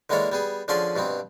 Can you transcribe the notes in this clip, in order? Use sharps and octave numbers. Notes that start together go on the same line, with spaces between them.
D3 E3 G#3 A#3 D4 C#5
G3 B3 G#4
D3 F3 C#4 G#4 D5 C6
G2 B2 B3 C4